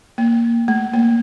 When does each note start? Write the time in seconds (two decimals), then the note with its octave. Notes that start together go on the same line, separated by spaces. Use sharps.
0.18 A#3
0.68 A3
0.93 A#3